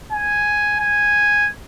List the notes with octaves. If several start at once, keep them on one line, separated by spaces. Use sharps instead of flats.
G#5
G#5